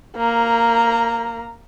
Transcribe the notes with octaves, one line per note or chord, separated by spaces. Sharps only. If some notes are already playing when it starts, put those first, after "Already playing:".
A#3 A#5